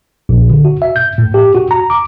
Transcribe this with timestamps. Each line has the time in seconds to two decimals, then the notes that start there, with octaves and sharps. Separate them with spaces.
0.29 A#1
0.50 D3
0.65 F#4
0.82 E5
0.96 G6
1.18 A2
1.34 G4
1.54 F#4
1.71 A#5
1.90 D6